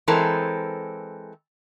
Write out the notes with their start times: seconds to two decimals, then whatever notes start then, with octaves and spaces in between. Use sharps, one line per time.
0.08 E3 G#3 C4 A4 A#4